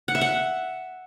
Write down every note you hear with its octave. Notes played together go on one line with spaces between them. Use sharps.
F#5
E5
F#5